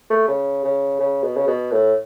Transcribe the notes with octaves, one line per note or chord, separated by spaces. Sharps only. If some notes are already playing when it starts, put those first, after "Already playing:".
A3
C#3
C#3
C#3
B2
C#3
B2
A2